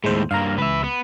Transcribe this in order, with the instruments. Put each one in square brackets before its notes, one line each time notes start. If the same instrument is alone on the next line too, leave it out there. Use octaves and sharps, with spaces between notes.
[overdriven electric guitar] D#2 A2 [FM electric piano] G#3 C5
[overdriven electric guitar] G2 A#3 [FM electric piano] F5 A#5
[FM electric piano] C#2 [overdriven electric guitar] B4 E5
[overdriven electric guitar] B3